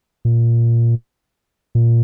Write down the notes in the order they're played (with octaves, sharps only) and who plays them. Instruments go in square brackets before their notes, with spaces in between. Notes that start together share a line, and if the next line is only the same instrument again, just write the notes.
[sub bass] A#2
A#2